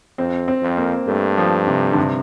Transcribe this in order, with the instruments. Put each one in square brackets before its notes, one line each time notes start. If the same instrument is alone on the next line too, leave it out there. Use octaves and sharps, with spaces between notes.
[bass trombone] F2 [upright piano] C4
[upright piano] C4
[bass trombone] F2
[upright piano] A#3
[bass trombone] G2 [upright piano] A3
[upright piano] F3
C3
D3
C3